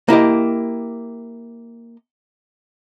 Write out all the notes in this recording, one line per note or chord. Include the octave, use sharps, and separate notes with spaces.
A#3 E4 G4 D#5